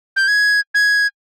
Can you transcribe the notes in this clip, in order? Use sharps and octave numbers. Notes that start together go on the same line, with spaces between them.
G6
G#6
G#6